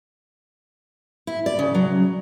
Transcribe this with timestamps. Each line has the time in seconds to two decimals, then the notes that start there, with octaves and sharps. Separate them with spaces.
1.27 E4
1.46 D5
1.59 C#3
1.75 F#3